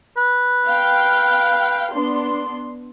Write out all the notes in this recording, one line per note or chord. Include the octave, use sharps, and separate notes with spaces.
B4
F5 G5
B3 D4 C6